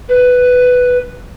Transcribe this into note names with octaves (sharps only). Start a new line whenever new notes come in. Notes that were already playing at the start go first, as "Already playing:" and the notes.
B4